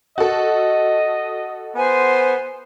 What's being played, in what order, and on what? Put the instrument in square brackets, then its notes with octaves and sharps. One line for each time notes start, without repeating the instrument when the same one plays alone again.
[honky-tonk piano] F#4 A4 [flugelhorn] D#5
[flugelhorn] B3 [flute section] C5 G#5